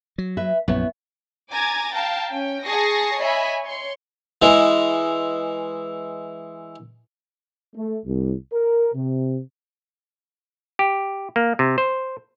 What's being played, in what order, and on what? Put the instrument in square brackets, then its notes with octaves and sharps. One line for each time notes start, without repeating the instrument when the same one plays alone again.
[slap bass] F#3
[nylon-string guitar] B4 E5
[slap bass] A#1 F#2 [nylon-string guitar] B3 E4 C#5
[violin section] G#5 A#5 D6 G#6 A6
F5 G5 A5 A#5
C#4 G5
G#4 A5 C#6 D#6 A#6 C7
C#5 D#5 E5 G#5 B5
C#5 C6 C#7
[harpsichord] E3 G#3
[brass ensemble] A3
C2
A#4
C3
[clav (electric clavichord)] G4
A#3
C3
C5